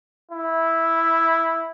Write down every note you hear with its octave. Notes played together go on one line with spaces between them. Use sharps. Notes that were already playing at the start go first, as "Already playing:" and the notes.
E4